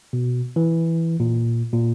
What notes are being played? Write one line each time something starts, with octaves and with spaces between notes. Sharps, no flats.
B2
E3
A#2
A#2